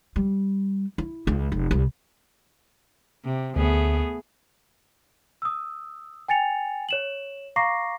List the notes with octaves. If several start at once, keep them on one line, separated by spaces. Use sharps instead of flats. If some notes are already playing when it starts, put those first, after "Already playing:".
G3
E4
C#2
F1
C2
C3
D2 A3 B3 G#4
D#6 E6
G5 G#5 A6 C#7 F7
C#5 E7 F#7
F5 A#5 C#6 D6 A#6 C7